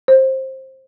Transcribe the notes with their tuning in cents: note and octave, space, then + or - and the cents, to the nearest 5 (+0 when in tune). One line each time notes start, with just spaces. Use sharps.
C5 +20